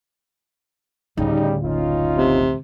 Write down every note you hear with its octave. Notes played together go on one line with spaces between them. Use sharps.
D2 A2 C#3 G3 D#4
F#1 C#4 D#4 F4
C3